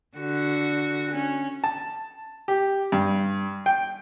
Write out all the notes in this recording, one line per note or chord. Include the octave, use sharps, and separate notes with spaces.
D3 F#4
C#4
A5
G4
G2
G5